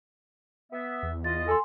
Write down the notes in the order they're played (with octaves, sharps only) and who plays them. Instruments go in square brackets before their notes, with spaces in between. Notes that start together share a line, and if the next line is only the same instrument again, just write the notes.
[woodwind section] B3 E5
[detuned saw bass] E2
[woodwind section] F4 D#5 [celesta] A6
[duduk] A4 [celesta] G#5 C6